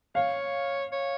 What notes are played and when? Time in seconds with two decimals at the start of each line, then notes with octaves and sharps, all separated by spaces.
0.15 C#5 F5
0.92 C#5